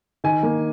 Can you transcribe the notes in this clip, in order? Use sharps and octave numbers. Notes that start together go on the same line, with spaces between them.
D#3 G#5
A#3